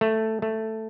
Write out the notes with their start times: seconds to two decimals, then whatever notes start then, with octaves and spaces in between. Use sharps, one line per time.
0.01 A3
0.42 A3